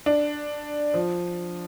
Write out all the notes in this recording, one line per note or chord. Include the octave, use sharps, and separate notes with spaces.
D4
F3